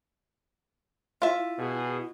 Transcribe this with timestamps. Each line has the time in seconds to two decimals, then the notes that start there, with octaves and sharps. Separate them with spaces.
1.22 E4 F4 E5
1.58 B2 G#4